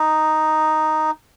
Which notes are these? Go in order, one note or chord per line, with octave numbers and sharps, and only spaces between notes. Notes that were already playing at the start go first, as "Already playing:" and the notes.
Already playing: D#4